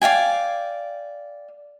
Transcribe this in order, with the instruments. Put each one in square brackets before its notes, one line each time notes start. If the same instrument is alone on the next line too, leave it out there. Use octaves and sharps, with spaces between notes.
[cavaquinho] D5 F5 G5 G#5